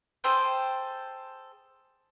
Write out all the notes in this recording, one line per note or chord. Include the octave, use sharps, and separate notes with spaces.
G#4 A4 C5 G5